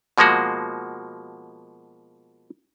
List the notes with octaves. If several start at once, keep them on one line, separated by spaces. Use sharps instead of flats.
B2 F3 G#3 A#3 F#4